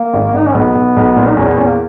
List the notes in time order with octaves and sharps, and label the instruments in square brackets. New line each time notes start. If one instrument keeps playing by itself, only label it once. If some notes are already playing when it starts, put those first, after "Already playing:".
Already playing: [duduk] A#3
[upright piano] G#1
[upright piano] G#1 [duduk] D#4
[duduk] C#4
[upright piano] B1 [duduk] B3
[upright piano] B1
B1
A#2
[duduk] D#4
[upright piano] E2 [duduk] C#4
[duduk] B3
[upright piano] E2 [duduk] C#4
[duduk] A#3